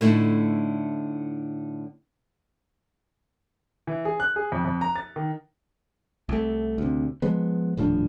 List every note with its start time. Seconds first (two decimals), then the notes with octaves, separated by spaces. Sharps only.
0.01 A2 D3 A3 D#4 E4
3.87 E3
4.05 G#4
4.20 F#6
4.36 G#4
4.52 F2
4.65 F2
4.81 A#5
4.96 A6
5.16 D#3
6.29 C2 A3
6.78 D2 C3
7.22 F3 G#3 B3
7.77 D#1 A2 F3 D4